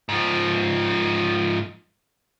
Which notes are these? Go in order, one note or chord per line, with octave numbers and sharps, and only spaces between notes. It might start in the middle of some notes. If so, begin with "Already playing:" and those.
G#2 F3